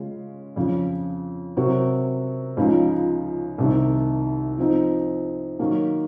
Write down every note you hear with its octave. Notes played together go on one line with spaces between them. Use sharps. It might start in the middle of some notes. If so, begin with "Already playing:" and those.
Already playing: C#3 G#3 C#4 F4
F2 C#3 F3
C3 F#3 C4 F#4 A#4
C#2 C#3 F3 G#3 D#4
C2 C3 D#3
F3 C4 D#4
D#3 F#3 A#3